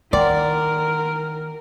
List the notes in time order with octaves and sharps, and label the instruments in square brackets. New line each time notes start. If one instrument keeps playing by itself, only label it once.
[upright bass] D#3 [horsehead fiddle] A#4 [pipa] D5 [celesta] F#5 G5 C6